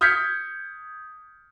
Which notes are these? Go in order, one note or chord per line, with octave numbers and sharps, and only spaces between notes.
D#6 F6 G6 G#6 B6 C#7